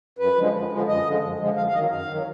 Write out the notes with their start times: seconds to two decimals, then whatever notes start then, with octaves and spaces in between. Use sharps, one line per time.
0.19 F#2 B4
0.36 D3 F3 G#3
0.53 F#2
0.71 D3 F3 G#3
0.88 F#2 D#5
1.05 D3 F3 G#3
1.23 F#2
1.39 D3 F3 G#3
1.57 F#2 F5
1.67 F5
1.74 D#3 F#3 D#5
1.91 F#2 F5
2.08 D#3 F#3